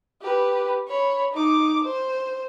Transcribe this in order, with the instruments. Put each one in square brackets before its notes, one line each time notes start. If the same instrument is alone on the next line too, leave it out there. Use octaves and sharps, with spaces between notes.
[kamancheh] G4 B4
C#5 B5
D#4 D6
C5